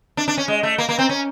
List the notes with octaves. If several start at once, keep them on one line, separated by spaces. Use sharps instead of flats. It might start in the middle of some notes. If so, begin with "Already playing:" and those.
D4
D4
C#4
G#3
A3
A#3
A#3
C4
C#4